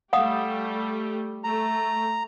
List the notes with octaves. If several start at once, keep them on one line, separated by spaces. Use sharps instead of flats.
G3 A3 G4 F5 F#5 D#6
A3 A#5